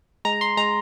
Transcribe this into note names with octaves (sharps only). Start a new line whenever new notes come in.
G#3 A#5
C6
G#3 A#5